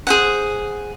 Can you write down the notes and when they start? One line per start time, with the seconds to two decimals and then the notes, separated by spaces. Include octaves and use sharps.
0.07 G#4 C5 F#5